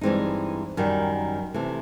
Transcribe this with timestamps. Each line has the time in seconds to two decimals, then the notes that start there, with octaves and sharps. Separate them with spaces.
0.01 G2 E3 G#3 C4 D#4
0.77 F#2 D#3 G3
1.54 C3 E3 A3